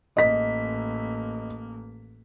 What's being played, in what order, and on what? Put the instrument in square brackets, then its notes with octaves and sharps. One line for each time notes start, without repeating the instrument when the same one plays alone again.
[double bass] A1 A#3 [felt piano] D#5 B6